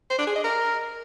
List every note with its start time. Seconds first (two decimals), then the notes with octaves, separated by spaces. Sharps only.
0.10 C5
0.19 D4
0.27 G#4
0.36 D#5
0.44 A#4